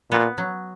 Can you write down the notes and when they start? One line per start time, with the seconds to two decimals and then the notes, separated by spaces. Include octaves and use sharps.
0.11 A#2 B3
0.38 F#3